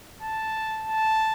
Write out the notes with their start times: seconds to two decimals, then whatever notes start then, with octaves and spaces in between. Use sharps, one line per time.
0.22 A5
0.87 A5